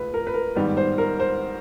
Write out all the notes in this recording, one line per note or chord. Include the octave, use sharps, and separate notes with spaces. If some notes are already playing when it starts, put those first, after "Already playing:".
Already playing: C#2 A3 B4
A#4
B4
A#4
G#2 D#3 G3 B3
C5
A#4
C5